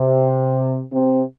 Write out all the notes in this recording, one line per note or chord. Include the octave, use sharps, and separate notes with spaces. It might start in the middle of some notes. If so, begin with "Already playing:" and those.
Already playing: C3
C3